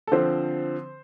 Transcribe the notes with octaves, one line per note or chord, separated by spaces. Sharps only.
A4
D3 F3 C4 C5